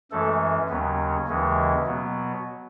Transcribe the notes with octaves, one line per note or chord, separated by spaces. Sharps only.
F#2 E3 G#3 A3 C#4 A4
D#2 C#3 F#3 B3 C#4 B4
D#2 C#3 E3 G#3 C#4
B2 F#3 B3